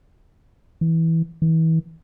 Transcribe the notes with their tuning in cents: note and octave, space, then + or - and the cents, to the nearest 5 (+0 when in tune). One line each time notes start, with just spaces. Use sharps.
E3 -15
E3 -35